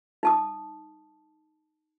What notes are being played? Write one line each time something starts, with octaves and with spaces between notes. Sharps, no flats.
D#4 A5 D#6